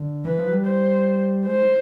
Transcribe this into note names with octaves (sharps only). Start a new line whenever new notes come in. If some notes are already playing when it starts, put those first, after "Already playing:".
Already playing: D3
E3 B4
F3
F#3
G3
C5
G#3 C5